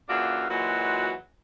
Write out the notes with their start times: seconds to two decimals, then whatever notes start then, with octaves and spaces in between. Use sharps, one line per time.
0.09 A#2 C#3 E3 D4 F#4 F5
0.50 A#2 E3 F#3 G#3 F#4